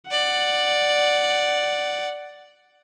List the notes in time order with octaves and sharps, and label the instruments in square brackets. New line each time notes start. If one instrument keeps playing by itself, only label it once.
[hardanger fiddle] D5 [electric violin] F#5